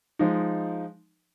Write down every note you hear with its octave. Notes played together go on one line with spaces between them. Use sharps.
F3 G#3 D#4